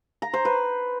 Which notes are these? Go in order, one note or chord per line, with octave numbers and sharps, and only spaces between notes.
A#5
C5
B4